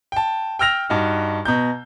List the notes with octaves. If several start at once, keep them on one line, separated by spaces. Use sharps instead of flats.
G5 A5
G5 E6 F6 A#6 F7
G2 D#4 F#4
B2 A#5 G6